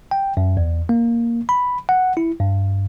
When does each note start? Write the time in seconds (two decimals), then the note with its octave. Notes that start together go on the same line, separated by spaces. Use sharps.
0.11 G5
0.37 F#2
0.57 E2
0.89 A#3
1.49 B5
1.89 F#5
2.17 E4
2.40 G2